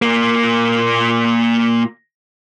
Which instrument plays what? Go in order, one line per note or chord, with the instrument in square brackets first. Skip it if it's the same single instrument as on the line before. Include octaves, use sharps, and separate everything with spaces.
[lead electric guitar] A#2 A#3